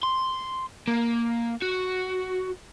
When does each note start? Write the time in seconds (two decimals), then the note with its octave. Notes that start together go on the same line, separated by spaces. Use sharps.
0.03 C6
0.88 A#3
1.62 F#4